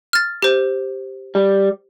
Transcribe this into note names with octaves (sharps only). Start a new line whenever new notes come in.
F6 A6
G4 C5
G3